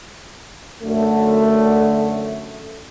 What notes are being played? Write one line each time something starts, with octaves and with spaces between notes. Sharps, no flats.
F#2 D3 A3